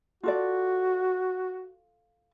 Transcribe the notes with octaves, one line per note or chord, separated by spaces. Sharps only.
F4 F#4 A4 D5